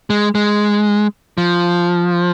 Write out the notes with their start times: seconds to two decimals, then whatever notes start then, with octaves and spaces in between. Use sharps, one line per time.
0.10 G#3
0.35 G#3
1.38 F3